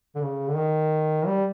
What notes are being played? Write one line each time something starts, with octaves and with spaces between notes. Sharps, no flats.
D3
C#3
D3
D#3
G3